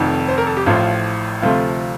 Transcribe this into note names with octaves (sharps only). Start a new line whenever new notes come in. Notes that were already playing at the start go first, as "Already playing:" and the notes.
Already playing: F1 F2 D#3
C5
A#4
A4
G4
A1 A2 F3 F4
D2 C3 F3 A3 F4